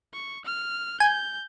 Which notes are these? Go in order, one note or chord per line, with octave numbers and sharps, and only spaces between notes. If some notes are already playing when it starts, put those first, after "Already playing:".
C#6
F6
G#5 G6